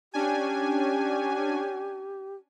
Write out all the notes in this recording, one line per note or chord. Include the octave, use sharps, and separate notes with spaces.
C#4 D4 G4 G#5